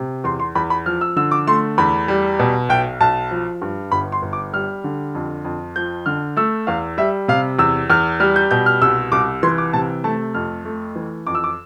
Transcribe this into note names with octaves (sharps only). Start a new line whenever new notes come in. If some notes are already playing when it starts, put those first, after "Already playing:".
Already playing: C3
E2 C6
C6
E2 B5
B5
F3 F6
E6
D3 E6
D6
A3 C6
E2 B5
G3
B2
B1 G5
B1 A5
F3
G2
G1 B5
C6
G1
D6
G3 F6
D3
F2
F2
F3 G6
D3 F6
A3 E6
E2 F5
G3 E5
C3 F5
E2 E6
E2 F6
G3 F6
G6
B2 G6
F6
C2 E6
C2 D6
E3 C6
D6
C3 A5
A3 A5
F2 F6
A3
E3
F2 D6
E6
D6